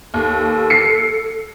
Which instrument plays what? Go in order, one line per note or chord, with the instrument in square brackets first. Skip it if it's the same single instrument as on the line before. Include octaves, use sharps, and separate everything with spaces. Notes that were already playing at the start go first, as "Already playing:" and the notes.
[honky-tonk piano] D#2 [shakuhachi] A4
[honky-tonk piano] C7 C#7